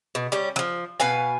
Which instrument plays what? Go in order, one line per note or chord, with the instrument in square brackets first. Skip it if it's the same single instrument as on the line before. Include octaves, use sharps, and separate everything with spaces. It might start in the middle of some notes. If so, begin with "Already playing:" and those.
[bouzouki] B2
G3 C#4
F3 F#3
B2 B4 F5 G#5